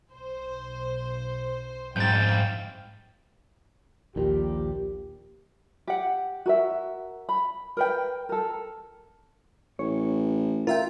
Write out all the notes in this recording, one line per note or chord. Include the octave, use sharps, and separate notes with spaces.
B1 C5
F2 G#2 F5 G5 G6 A6
A#1 D#2 A#2 G4
G4 F#5
F#4 A#4 E5
B5
A#4 B4 G5
A4 A#4
A1 C#5
F4 A#4 E5 G5